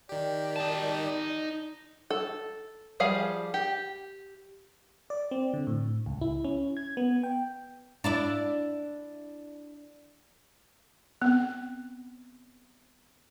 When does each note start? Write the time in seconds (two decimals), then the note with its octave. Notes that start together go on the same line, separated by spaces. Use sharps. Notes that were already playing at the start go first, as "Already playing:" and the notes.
0.09 D#3 G4 D5
0.56 D#4 A5
2.10 A4
3.00 F3 G3 G#4 F5
3.54 G4
5.10 D5
5.31 C4
5.54 D3
5.67 A2
6.06 C#2
6.21 E4
6.44 C#4
6.77 G#6
6.97 B3
7.23 G5
8.04 D4 E4 D5
11.22 B3 C4